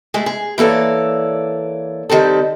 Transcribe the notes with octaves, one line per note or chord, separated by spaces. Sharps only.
G#3 A3 G#4
G#4
E3 A#3 A4 C#5 D5
D#3 G3 C4 A4